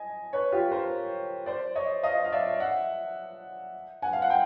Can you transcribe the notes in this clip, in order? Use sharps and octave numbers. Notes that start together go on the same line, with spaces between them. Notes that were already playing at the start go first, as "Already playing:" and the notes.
Already playing: D#5 G#5
B4 C#5
F4 G4
A#4 C5
C5 D5
C#5 D#5
D#5 F5
F5
D5 E5
E5 F#5
F#5 G#5
F5
F#5
G5